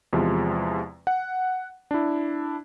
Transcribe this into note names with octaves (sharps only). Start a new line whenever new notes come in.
E2 C3 F3 G#3
F#5
D4 E4